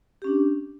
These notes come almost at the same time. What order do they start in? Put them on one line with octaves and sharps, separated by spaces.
G4 C#4 D4